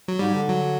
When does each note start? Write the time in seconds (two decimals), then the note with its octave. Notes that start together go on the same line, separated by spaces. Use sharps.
0.08 F#3
0.19 G#2 G3
0.34 D3
0.49 F#3